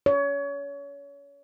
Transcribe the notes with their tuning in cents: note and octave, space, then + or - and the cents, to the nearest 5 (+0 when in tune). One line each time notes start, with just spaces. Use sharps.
C#5 +30